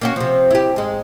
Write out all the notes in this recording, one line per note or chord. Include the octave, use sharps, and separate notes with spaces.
A#3 C#4 F#4
C3 F3
E4 G4
G#2 G#3